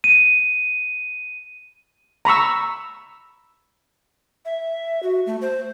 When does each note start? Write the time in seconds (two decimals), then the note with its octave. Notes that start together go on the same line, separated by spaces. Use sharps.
0.04 D#7
2.25 A#5 B5 C#6 E6
4.45 E5
5.03 F#4
5.27 A3
5.42 C5